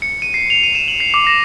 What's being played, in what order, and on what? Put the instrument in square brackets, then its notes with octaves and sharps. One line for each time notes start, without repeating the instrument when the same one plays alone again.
[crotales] C#7
D#7
C7
F7
D#7
E7
F#7
C7
D6
A#6